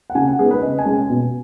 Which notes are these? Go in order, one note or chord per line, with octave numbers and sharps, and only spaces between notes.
F#5
C#3 G#5
F#5
G#3 B3 D#4 G#4
B4
C#3 D#5
G#5
G#3 C#4
G#5
B2